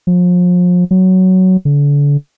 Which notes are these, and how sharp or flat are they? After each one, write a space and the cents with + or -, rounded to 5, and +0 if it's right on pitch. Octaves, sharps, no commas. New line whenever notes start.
F3 +35
F#3 +10
D3 -35